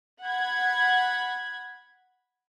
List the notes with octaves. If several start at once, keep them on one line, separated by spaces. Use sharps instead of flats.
F#5 B5 G#6